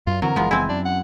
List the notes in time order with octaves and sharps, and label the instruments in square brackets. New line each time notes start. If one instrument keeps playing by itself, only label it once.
[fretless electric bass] F#2 [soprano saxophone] F4
[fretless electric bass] D3 E3 C4 [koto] F#3 [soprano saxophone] A#4
[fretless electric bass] F#1 E3 G#3 [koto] F3 B3
[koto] C4 E4 [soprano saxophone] G#5
[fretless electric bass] F#2 [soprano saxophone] D4
[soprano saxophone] F#5